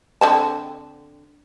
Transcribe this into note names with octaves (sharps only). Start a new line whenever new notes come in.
D3 C4 A5